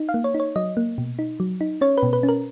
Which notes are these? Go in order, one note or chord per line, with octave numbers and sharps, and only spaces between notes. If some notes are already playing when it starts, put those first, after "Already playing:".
Already playing: D#4
F5
A#3
C#5
D#4
C#5
F#3 D#5
A#3
B2
D#4
F#3
D#4
C#4 C#5
B4
B2
B4
C#4
A#4